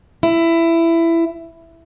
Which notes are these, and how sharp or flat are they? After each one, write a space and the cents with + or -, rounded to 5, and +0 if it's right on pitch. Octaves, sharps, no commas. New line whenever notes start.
E4 +15